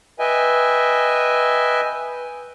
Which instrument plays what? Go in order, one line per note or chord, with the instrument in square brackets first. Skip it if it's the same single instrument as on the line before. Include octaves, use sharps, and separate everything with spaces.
[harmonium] B4 D#5 E5 G5 G#5